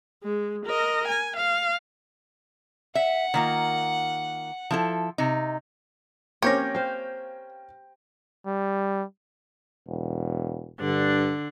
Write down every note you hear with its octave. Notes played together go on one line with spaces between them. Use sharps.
G#3
A#4 D#5
G#5
F5
E5 F#5
D#3 A#3 F4
F3 E4 A4
C3 D#4
A#3 C4 C#4 G4 C#5 D6 G6 A#6
C5 F5 G5
G3
E1
G2 D3 D4